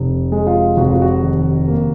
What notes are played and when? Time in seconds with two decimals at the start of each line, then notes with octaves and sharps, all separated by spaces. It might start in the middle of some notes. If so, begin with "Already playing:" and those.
Already playing: F1
0.32 G#3
0.47 F4
0.77 F1 F#4
0.90 F4
1.02 F#4
1.23 D#2
1.68 A#3